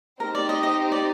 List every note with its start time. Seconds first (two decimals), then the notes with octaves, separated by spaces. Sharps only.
0.20 C4 D#4 G4 A#4
0.35 D5
0.49 D#5
0.63 D#5
0.92 D5